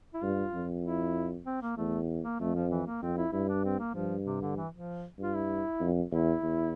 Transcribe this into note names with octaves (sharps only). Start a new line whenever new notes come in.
E4
G2 F4
F2
E4
C4
A#3
E2 A3
A#3
F2 A3
F3
E3
A#3
F2 C4
E4
G2 E4
D4
C4
A#3
G2 F3
C3
D3
E3
F3
G2 F4
E4
F2
E2 E4
E2